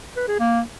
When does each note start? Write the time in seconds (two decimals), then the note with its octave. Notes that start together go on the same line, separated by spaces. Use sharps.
0.17 B4
0.28 G#4
0.39 A#3